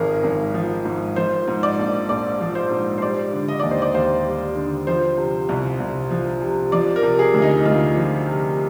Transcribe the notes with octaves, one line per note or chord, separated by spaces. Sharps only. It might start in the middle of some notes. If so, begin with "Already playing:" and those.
Already playing: G#1 G#2 F3 G#4 A#4
G#1
F3
G#2
F3 C5
G#2
D5
A#1
A#1 D5
F3
C5
G#2
C5
G3 D5
D3
D#5
D#2 D5
C5
D5
D#2 C5
G3
D3
F3 C5
C3
C2
C2
F3
C3
F3 D5
A#4
C3
G#4
D2
D#4
D2 F4
F3
C3